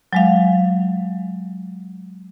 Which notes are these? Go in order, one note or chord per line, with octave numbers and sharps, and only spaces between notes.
F#3 G#3 F5